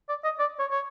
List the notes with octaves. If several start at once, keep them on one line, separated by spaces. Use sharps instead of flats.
D5
D#5
D5
C#5
C#5